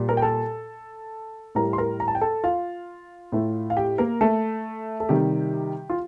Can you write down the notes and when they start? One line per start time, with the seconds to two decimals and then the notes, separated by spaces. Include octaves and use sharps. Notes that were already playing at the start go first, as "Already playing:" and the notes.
Already playing: A#2 G3
0.09 A#4 A#5
0.17 G5
0.22 A4 A5
1.55 A2 G3 A#4 A#5
1.73 C6
1.78 A#4 A#5
2.00 A#5
2.08 A5
2.15 G5
2.21 A4 A5
2.44 F4 F5
3.32 A2 A3
3.70 F5
3.77 G4 G5
3.98 A#3 A#4
4.21 A3 A4
5.00 A4
5.09 C3 D#3 G3 G4
5.90 F4